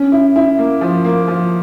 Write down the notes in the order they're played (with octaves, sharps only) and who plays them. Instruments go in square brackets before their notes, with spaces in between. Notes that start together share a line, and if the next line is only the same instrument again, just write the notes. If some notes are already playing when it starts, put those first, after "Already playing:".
Already playing: [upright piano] C#4
E4
E4
A#3
F3
A#3
F3